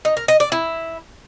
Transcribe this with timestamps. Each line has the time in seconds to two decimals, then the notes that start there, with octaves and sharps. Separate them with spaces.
0.05 D#4
0.17 A#4
0.28 D#5
0.40 D5
0.52 E4